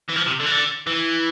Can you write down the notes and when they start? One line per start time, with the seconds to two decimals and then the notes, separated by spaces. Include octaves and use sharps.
0.09 E3
0.16 F3
0.26 C3
0.39 D3
0.46 E3
0.51 D3
0.87 E3